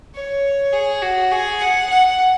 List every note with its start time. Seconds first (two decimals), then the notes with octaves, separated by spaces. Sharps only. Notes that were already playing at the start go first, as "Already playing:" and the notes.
0.15 C#5
0.73 G#4
1.02 F#4
1.31 G#4
1.61 F#5
1.90 F#5